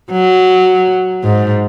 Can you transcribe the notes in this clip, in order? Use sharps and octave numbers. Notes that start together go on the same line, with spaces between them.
F#3
G#2